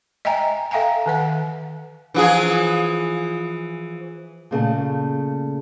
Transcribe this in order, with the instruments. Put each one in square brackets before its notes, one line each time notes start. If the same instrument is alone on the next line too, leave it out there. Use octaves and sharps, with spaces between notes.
[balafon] D#5 E5 G5 G#5 A#5
A4 E5 F5 G5 G#5 A#5
D#3 B4 F#5
[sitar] E3 F3 G#4
[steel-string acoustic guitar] A#2 C#3 A3